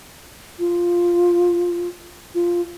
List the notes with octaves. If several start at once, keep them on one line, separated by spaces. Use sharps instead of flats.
F4
F4